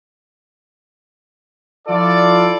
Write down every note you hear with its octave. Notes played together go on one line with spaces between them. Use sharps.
F3 E4 F4 A4 D5